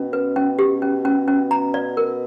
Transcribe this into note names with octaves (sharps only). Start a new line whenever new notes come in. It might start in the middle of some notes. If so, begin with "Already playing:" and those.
Already playing: B2 C#4
B4
C#4
G4
C#4
C#4
C#4
A#5
D5
A#4